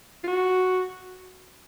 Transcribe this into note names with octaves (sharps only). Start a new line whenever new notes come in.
F4
F#4